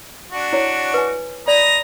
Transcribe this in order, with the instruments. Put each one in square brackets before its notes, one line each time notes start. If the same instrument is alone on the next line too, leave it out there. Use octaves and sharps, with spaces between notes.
[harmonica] D4 F#4
[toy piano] E4 C#5
B4 G#5
[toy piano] D5 [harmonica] D#5 A#5 B5